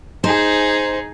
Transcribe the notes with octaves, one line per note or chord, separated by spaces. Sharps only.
D#4 G#4 C5